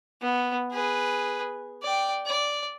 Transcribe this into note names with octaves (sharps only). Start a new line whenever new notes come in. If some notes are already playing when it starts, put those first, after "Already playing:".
B3
G#4 B4
D5 G5
D5